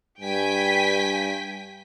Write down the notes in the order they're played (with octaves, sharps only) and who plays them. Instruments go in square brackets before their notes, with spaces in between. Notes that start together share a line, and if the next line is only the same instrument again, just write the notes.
[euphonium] G2 [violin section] G5 G#5 B6